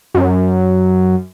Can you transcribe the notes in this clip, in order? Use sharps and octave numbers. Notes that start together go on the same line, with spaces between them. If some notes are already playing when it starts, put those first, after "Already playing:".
F#2